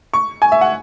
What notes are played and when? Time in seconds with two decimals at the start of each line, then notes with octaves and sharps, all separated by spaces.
0.14 C#6
0.42 G#5
0.52 E5
0.61 F#5